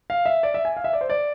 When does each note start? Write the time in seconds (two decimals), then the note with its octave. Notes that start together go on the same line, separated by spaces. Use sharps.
0.10 F5
0.26 E5
0.43 D5
0.54 E5
0.65 G#5
0.77 F5
0.84 E5
0.93 D5
1.01 C5
1.10 D5